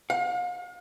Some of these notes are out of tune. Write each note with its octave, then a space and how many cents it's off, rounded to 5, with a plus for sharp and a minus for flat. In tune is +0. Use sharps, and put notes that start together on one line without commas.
F5 +40